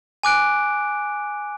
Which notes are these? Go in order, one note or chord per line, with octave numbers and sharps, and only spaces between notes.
G#5 D6 F#6 D7